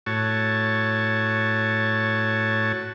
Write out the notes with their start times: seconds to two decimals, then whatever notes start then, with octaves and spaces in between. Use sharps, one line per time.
0.06 A2 F#4 C#5 A5